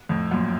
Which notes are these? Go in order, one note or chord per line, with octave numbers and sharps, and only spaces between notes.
F2 A2
F#2 A#2